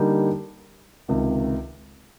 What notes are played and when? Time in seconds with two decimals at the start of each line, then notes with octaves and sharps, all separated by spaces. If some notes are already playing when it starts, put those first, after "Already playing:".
Already playing: D3 G3 A#3 D#4 G4
1.08 C#2 C3 D#3